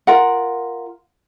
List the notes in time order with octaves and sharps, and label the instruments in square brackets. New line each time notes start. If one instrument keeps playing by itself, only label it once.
[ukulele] F4 A#4 F#5